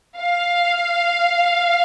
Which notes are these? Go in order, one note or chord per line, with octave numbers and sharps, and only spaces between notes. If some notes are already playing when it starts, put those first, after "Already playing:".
F5